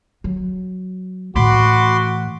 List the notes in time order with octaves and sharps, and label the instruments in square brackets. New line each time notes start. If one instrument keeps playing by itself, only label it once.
[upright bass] F#3
[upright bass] A2 E3 [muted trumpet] F#4 [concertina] B5 C6 D6